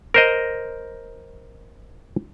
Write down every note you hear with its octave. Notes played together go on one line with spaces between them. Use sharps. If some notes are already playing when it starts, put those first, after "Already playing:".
A#4 C5 D#5